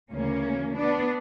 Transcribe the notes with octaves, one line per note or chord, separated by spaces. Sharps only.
D2 C#3 E3 A#3 C#4
B3 D4